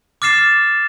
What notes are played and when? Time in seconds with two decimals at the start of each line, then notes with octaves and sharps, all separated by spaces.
0.22 D6 F6 A6 C7 E7